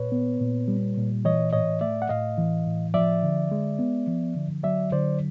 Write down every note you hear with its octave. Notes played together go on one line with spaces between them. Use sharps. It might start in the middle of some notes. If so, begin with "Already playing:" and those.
Already playing: A#2 B4 C#5
B3
A#2
G3
A#2
E3 C#5 D#5
A2 C#5 D#5
A3 D5 E5
F#5
A2 D#5 F5
E3
A2
F3 D5 E5
D3
G#3
B3
F3
D3
F#3 D5 E5
D3 C5 D5